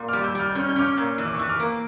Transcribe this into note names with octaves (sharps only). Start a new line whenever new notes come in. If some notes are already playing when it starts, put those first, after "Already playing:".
Already playing: A#2
G3 D6 F6
E6 G6
G3 F6
G6
C#4 F6
G6
C#4 D6 F6
A#2
E3 E6
D6
E3 C#6 E6
D6 F6
A#3